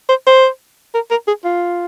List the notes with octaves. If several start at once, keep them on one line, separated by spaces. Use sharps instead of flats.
C5
C5
A#4
A#4
G#4
F4